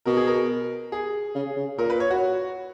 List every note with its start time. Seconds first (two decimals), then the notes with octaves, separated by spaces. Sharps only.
0.05 B2 A#4
0.17 G#4
0.27 A#4
0.92 G#4
1.35 C#3
1.56 C#3
1.78 A#2 A#4
1.90 B4
2.00 C#5
2.10 F#4